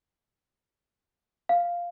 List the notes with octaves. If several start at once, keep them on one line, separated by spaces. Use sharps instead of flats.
F5